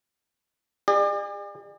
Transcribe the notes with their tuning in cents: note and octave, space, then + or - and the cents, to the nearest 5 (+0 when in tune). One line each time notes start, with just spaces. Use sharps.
G#4 -45 D5 +40